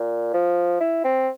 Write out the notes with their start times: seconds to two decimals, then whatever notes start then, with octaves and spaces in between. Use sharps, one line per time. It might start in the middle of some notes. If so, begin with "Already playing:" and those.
Already playing: A#2
0.34 F3
0.80 E4
1.04 C4